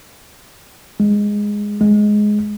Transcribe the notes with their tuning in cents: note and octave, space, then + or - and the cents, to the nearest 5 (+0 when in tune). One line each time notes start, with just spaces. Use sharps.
G#3 -5
G#3 +10